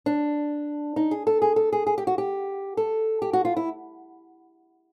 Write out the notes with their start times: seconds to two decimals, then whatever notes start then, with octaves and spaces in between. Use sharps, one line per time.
0.06 D4
0.96 D#4
1.11 G#4
1.27 A4
1.42 G#4
1.56 A4
1.73 G#4
1.87 G#4
1.98 G4
2.07 F#4
2.18 G4
2.77 A4
3.22 G4
3.33 F#4
3.45 F4
3.57 E4